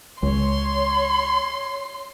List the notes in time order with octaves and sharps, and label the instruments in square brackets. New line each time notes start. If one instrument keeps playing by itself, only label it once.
[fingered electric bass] C#2 [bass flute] C#5 [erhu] C6